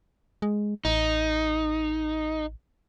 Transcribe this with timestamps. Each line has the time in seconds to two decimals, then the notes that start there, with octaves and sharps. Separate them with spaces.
0.42 G#3
0.85 A1 D#4